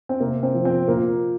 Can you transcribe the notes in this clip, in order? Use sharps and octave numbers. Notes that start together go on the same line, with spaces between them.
C4
C3 A#3
C4
F3
C4
A#2 A#3